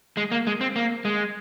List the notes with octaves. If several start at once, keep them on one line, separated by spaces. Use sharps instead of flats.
G#3
A#3
G#3
C4
A#3
G#3